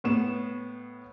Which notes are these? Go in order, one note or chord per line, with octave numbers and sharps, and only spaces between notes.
A2 B3 E7